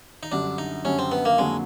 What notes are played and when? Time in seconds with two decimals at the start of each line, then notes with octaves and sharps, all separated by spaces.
0.23 D#4
0.32 F#2 D3 G3 D4
0.58 D#4
0.85 F#2 D3 G3 C#4
0.99 C4
1.11 B3
1.25 A#3
1.38 F2 D3 F#3 G#3 A#3